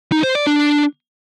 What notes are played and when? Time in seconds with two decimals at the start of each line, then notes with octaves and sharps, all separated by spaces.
0.12 D#4
0.24 C5
0.35 D5
0.47 D4